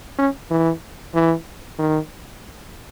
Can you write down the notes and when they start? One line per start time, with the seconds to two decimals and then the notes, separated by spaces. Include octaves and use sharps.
0.18 C#4
0.51 E3
1.14 E3
1.79 D#3